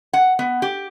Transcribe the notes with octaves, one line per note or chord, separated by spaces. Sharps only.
F#5
B3
G4